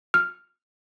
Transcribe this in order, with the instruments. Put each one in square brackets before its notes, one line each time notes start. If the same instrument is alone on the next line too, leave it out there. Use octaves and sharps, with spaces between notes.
[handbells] F6